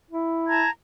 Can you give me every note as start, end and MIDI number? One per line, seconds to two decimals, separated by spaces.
0.11 0.65 64
0.48 0.69 81
0.48 0.69 82
0.48 0.69 92